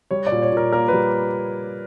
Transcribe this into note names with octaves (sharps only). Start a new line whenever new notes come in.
G3 C#5
D5
A#2
C#5
A#2 A#4
A#3 A#4
B4
G3